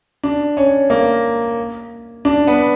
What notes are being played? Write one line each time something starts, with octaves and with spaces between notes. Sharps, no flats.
D4
C#4
A#3
D4
B3